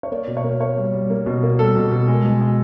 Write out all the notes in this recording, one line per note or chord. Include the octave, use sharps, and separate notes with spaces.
C#5
A#3 D5
B2
C#5
A#3
A#3 C#5
G3
G3
A#3
B2
A#3
G3 A4
B2
B2
G#3
B2
G#3